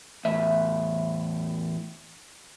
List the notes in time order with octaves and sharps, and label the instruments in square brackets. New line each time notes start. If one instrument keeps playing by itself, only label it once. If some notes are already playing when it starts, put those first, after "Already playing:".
[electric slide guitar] E2 A2 E5